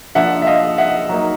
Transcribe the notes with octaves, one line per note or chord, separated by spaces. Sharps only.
F3 A#3 D4 E5 F#5
E5
D#5 F5
E5 F#5
F#3 A#3 D#4